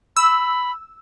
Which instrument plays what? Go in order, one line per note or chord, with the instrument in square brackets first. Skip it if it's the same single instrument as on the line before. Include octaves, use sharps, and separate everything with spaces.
[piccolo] B5 [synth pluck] E6